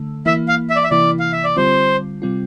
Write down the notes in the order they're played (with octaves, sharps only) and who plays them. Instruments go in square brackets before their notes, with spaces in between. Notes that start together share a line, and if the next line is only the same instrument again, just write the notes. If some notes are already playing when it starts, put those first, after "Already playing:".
Already playing: [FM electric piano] D3 A3
[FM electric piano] E3 A#3 E4 [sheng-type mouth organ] E5
[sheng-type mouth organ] F5
E5
D5
E5
[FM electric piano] C3 E3 A#3 E4 [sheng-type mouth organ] D5
[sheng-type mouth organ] F5
E5
D5
[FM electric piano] D3 G3 C4 F4 [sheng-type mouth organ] C5
[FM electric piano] C3 G3 C4 F4